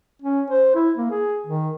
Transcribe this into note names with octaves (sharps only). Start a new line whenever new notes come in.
C#4
C5
E4
A#3
G#4
D#3